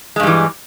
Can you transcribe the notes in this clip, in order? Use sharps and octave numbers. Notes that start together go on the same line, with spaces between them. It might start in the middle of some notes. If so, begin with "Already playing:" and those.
G2 E3 G3 G#3